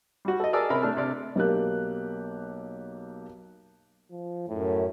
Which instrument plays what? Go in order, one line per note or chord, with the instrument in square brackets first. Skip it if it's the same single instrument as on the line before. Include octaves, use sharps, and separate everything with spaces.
[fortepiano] G3 F#4
A4 D#5
G#4 A#4 D5 A5 D#6 E6
C3 C#4 A#4 B5
A3 D4 A4 F6
C3 D5 F6
[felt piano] B1 A#3 G4 F#6
[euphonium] F3
[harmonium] F#2 [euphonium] A2